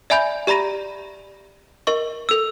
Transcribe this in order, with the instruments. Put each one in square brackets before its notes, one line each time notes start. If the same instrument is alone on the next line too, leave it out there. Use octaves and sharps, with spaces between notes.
[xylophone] D5 E5 G#5 B5 G6
G4 D5 A#5 B5 A#6 D#7
A#4 D#5 C#6
A4 E6